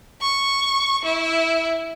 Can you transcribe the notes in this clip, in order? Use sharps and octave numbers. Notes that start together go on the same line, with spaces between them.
C#6
E4